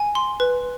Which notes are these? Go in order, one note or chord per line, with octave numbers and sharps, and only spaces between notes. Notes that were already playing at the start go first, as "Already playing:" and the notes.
Already playing: G#5
C6
B4